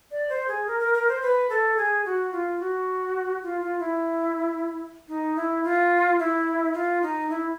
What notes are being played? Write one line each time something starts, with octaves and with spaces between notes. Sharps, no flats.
D5
C5
G#4
A#4
A#4
A#4
C5
B4
A4
G#4
F#4
F4
F#4
F4
F4
E4
D#4
E4
F4
E4
F4
D#4
E4